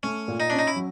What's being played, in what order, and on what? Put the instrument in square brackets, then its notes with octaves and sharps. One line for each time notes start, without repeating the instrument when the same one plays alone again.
[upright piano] A3 [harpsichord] C#4
[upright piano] A#2
[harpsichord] D#4
[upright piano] C#4 [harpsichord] D4
[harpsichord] D#4
E4
[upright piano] F#3